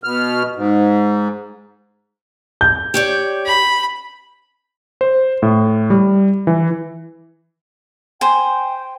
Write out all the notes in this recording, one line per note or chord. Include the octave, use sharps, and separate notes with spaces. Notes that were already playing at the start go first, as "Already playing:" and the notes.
B2 F6
G#2
G6
G4 C#5 D5
B5
C5
A2
G3
E3
C5 G5 G#5